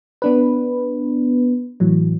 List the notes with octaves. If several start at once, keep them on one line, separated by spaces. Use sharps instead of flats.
B3 D4 B4
A2 E3 F#3